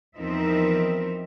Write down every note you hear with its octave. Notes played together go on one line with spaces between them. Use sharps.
E2 F3 C4 D#4 A#4 E5